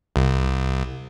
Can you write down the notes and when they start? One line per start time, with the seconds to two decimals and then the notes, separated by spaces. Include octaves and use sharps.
0.16 C2